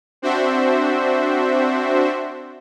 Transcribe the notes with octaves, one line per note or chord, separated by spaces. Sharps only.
C4 D4 F#4 C5 E5